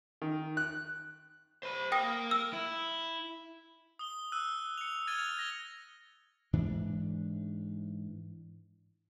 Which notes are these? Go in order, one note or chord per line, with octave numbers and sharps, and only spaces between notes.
D#3
F#6
C5 B5
A#4 F5 G5 D#6 A#6
E6
E4
D#6 G7
E6 F#6 D#7
C#7 F7
F6 G#6 A6 D#7 F7 G7
G#6 A#6 G7
G#2 E3 D4